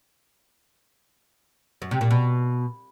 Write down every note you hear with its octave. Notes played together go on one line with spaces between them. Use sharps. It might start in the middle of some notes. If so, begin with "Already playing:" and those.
F#2
C3
A#2
B2